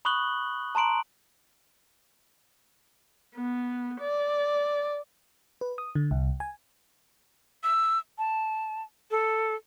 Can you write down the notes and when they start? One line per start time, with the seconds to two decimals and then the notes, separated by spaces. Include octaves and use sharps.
0.05 B5 C#6 D#6 F#6 F#7 G7
0.75 A5 A#5 C6 D7 F#7
3.35 B3
4.01 D5
5.61 B4
5.78 D#6
5.95 D3
6.11 C2
6.40 G#5
7.64 E6
8.18 A5
9.11 A4